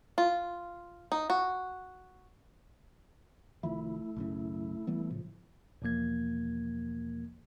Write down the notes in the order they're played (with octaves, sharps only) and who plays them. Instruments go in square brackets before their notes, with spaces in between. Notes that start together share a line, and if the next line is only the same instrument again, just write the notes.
[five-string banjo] F4
D#4
F#4
[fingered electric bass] C2 D#3 F3 [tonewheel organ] A3 E4
[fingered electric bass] B1 F#2 C#3
E3 G3 B3
[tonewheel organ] A2 C#3 [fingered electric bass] F3
[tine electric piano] E2 B2 F3 A#3 G#6